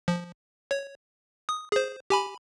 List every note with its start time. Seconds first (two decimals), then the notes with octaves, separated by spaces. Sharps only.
0.08 F3
0.71 C#5
1.49 D#6
1.72 G#4 C5
2.10 G4 G#5 B5